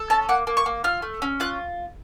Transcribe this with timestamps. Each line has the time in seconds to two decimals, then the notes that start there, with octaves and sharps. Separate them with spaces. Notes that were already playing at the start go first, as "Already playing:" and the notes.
Already playing: A4
0.10 C#4 A5
0.29 A#3 F#5
0.47 A#3
0.57 C#6
0.66 A#3
0.84 F4 F6
1.02 A3
1.22 C#4
1.40 F4 F#6